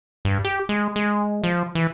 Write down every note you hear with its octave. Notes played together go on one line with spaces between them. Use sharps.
G2
G4
G#3
G#3
F3
E3